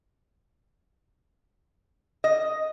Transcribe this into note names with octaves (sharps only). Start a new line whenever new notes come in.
D#5